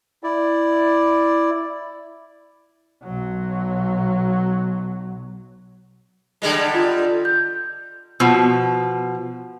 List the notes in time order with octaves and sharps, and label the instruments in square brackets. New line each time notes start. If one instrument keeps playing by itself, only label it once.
[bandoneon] E4 D5
[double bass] B1 F#3
[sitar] D3 G3 G#3
[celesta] F4
G6
[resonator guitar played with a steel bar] B2 F3